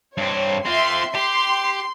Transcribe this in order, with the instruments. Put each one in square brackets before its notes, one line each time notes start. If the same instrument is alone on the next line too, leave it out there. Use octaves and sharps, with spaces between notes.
[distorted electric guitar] G2 C4 [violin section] C#5
[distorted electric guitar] C4 F4 [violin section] E5 C6
[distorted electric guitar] G4 [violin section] C6